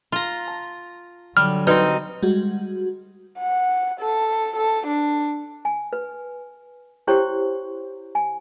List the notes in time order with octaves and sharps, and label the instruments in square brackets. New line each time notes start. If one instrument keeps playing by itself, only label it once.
[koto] F4 A#5
[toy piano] A5
[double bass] D3 F#3 [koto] G3 [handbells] F6
[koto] C4 D#4 [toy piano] F#4 B4 D5
[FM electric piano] G3 G#3 F#4
[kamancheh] F#5
A4
A4
D4
[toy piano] G#5
B4
E4 G4 C5 C#5 G5 C6
G#5